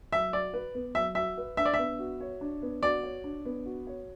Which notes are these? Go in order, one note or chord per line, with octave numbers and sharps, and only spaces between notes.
F#3 E5
F#4 D5
B4
B3
F#3 E5
F#4 E5
B4
D4 E5
D5
E5
B3
F#4
C#5
D4
B3
F#4 D5
C#5
D4
B3
F#4
C#5